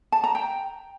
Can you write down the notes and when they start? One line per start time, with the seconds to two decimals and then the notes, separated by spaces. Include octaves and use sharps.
0.12 A5
0.24 A#5
0.35 G5